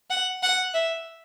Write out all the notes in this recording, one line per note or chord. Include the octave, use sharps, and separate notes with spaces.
F#5
F#5
E5